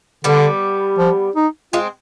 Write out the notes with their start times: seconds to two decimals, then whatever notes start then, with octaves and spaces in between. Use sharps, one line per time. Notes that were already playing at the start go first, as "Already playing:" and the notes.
0.24 D3 G3 B3
0.99 F3
1.36 D#4
1.73 G#3 C4 F4